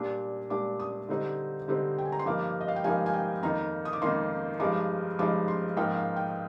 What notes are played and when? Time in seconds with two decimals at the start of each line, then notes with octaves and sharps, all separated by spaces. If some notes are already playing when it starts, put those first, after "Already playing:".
Already playing: A#2 G3 D4
0.50 A#2 G3 D4 D6
0.80 D#6
1.09 D3 G3 C4 D#4
1.68 D3 G3 C4 D#4
1.98 G5
2.05 G#5
2.12 A#5
2.19 C6
2.25 G2 F3 A#3 D#4 D6
2.61 D#5
2.68 F5
2.76 G5
2.84 G2 F3 A#3 D#4 G#5
3.06 G#5
3.14 G5
3.42 F2 D#3 A#3 D#4 A#5
3.85 D#6
3.93 D6
4.02 F2 D#3 A#3 D#4 C6
4.60 G2 F3 G#3 D#4 D6
5.19 G2 F3 G#3 D#4 D6
5.48 C6
5.77 G#2 F3 A#3 D#4 G5
5.96 F5
6.16 G5